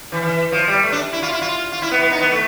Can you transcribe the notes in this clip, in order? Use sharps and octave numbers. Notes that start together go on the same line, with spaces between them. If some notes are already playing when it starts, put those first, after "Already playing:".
E3
E3
F3
G3
A3
D4
E4
F4
E4
F4
F4
E4
B3
B3
D#4
B3
A3